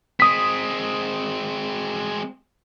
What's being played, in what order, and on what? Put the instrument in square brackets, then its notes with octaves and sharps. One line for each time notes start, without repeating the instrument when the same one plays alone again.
[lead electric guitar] G#3 C4 [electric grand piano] D#6 B6